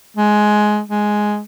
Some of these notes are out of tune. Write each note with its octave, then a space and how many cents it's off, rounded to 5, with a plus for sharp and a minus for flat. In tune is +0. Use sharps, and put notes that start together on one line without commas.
G#3 +15
G#3 +5